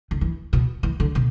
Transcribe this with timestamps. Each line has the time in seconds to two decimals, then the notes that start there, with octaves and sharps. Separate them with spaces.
0.11 D3
0.21 E3
0.53 B2
0.83 E3
1.00 D3
1.15 B2